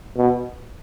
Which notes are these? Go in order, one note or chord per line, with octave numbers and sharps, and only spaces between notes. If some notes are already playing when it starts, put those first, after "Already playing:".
B2